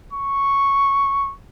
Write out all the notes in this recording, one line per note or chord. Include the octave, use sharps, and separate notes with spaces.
C#6